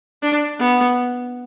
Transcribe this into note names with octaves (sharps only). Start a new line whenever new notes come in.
D4
B3